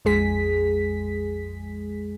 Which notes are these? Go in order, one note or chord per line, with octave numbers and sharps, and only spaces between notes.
A#1 F2 G#3 G#4 B6